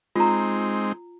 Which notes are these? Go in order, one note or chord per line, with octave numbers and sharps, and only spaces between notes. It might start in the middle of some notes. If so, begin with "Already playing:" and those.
G#3 C4 D#4 F4 A#5